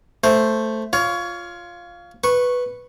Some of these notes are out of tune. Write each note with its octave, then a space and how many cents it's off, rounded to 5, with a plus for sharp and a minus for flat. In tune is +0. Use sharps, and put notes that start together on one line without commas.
A3 +0 C5 +0
F4 +0 C#5 +25
B4 +0 C#6 -10